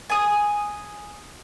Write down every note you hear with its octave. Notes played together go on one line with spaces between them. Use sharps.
G#5 D#6